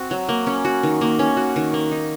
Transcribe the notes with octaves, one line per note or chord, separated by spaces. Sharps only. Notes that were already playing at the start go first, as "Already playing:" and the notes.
Already playing: C4 F#4
F#3
A#3
C#4
F#4
D#3
A#3
C#4
F#4
D#3
A#3
D#4